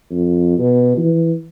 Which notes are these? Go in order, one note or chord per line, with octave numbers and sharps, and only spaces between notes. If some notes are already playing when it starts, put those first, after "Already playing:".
F2
B2
E3